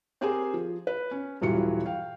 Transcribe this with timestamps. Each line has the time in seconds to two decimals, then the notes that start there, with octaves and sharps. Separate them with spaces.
0.21 C4 G4 G#4 A#4 C5 G#5
0.54 F3
0.87 B4
1.11 C#4
1.41 D#1 G2 E3 F#3 F4 C#7
1.86 F5 G5